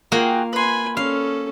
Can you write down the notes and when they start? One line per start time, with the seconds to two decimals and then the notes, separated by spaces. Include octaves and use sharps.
0.12 A#3 F4 F#4 G#4 G5
0.53 B4 G#5 B5 C6
0.97 C#4 A4 F5